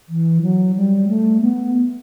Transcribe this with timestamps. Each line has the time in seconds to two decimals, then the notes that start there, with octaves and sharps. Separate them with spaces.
0.09 E3
0.42 F#3
0.76 G3
1.08 A3
1.42 B3